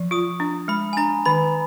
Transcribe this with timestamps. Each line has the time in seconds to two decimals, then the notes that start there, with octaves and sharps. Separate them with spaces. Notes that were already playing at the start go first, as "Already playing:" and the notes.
Already playing: F3
0.11 F4 D#6
0.40 D4
0.68 G#3 B5
0.93 G#5
0.97 D4 A#5
1.26 D#3 B5